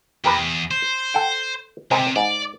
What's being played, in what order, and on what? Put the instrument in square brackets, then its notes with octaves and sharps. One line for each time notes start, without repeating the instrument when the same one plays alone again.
[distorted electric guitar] E2 [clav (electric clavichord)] G4 A#4 B4
[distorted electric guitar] C5
[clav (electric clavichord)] A4 F#5 G5
[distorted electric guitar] C3 [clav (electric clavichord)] G#3 C4 A#4
[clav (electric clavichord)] G#2 [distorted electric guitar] D5